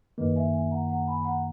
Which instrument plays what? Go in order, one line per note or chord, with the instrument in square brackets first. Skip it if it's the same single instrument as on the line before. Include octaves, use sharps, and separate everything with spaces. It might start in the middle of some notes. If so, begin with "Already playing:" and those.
[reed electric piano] F#2 D#3 A#3 [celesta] B4 D#5
[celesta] E5 G#5
E5 G#5
F#5 A#5
F#5 A#5
G#5 B5
F#5 A#5